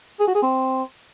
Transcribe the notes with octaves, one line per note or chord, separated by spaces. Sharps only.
G#4
F#4
G#4
C4